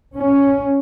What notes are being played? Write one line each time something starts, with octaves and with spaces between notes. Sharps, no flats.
C#4